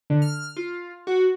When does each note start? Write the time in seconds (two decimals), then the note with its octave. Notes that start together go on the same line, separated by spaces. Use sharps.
0.10 D3
0.22 F6
0.56 F4
1.07 F#4